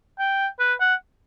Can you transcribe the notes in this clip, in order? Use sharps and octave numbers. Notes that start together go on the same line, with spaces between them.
G5
B4
F#5